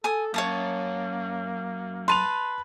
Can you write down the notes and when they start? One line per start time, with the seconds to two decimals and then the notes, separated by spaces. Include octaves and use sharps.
0.04 A4 G#5 D#6
0.34 F#2 A#3 C#5 A5 D#6
2.08 B4 A5 C6 D#7 F7